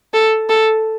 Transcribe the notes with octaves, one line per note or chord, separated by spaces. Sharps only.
A4
A4